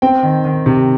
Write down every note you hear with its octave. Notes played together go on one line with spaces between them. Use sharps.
C4 G5
D#3
D#3
C3